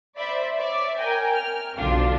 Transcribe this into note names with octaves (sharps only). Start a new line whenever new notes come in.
C5 D5 E5 B5
C#5 D5 E5
A#4 G5 G#5
F6
B1 D3 F3 D4 F4